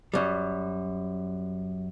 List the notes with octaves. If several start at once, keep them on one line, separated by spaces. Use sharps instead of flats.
F#2 G3